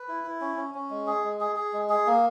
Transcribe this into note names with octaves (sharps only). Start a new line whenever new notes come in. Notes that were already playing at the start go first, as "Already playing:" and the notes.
Already playing: B4
E4
E4
C#4
C#4
C#4
G#3
G#4
G#3
G#4
G#4
G#3
G#4
A#3